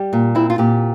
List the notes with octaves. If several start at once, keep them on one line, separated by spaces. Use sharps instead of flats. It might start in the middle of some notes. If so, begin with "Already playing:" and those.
Already playing: G3 G4
A#2
C4 E4
F4
A#2 G4